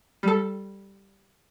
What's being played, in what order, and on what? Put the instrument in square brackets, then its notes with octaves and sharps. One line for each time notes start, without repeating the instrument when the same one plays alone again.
[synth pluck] G3 A4